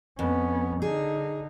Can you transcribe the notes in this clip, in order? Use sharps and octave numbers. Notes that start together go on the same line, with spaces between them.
F2 B3 C#4
D3 D#4 G#4